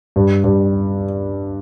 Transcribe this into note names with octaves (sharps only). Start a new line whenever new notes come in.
G2
G2